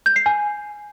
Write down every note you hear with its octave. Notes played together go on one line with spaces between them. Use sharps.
G6
C7
G#5